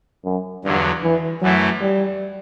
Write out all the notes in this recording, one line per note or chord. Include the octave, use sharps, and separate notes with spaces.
F#2
E2 G2 D3 F#3
E3
F#2 E3 F#3 A3 E4
G3